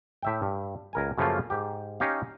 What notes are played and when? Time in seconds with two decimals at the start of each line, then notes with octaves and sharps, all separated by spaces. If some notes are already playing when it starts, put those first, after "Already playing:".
0.22 A2 E5 G5
0.42 G2
0.93 C#2 A#4 G#5
1.18 F#2 C#3 F3 A3 A#3 F4
1.50 G#2 G4
2.00 C#4 D#4 G4 D#5 F5